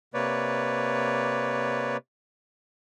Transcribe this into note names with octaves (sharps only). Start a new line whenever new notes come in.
C3 A#3 B4 C#5 D5